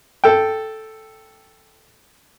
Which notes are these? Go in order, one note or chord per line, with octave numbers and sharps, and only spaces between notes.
A4 G5